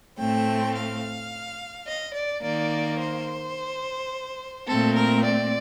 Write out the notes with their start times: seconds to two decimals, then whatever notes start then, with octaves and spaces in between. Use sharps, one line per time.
0.18 A2 A3 C4 G5
0.75 F5
1.86 D#5
2.14 D5
2.42 D#3 A#3 D5
2.99 C5
4.68 A#2 A3 C4 A4
4.95 A#4
5.24 D5